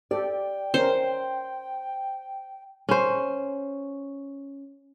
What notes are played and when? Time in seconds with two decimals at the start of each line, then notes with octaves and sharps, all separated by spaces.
0.11 G4 A4 D5 G5
0.74 C#4 A#4 C5
2.89 C#4 C5